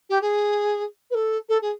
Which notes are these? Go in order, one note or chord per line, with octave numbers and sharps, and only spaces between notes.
G4
G#4
B4
A4
A4
G#4